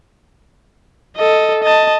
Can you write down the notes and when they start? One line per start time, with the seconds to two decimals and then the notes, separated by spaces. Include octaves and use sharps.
1.17 A4 D#5
1.63 D#5 A5